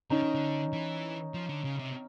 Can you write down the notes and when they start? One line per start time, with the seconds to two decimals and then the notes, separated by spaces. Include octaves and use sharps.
0.10 D3 C#4 D#4
0.23 D#3
0.35 D3
0.73 E3
1.34 F3
1.49 D3
1.64 C#3
1.79 C3